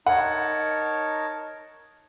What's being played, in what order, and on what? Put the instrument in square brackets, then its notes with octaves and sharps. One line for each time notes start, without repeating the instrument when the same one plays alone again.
[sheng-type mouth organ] D#4 A#4 C#5 A5 [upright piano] F#5